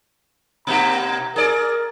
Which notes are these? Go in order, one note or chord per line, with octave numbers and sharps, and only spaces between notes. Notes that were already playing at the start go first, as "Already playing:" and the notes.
B2 A#3 G4 A#5
G#4 A#4 D5